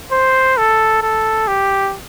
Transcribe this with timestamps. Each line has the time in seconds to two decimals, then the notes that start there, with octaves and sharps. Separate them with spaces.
0.12 C5
0.57 A4
1.02 A4
1.47 G4